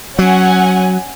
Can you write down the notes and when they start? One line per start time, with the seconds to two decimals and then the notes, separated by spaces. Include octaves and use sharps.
0.19 F#3 C#4 F#5 G#5